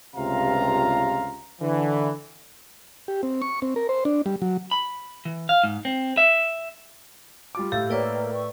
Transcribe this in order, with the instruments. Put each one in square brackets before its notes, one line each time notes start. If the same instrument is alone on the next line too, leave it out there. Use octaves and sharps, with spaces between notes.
[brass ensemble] C#2 G2 C3 F4 F5 A#5
D3 E3
[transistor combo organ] G4
C4
C#6
C4
A#4
C5
D4
G3
F#3
[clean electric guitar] B5
E3
F5
G#2
C4
E5
[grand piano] G3 F4 D6
[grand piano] A2 [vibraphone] G4 [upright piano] F5 E6 A6
[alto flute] A#3 [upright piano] A#4 C#5 [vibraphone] B4 D5 G5
[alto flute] C#6